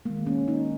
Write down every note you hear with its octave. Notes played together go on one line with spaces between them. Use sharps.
D#3 G#3 A#3
C#4
D#4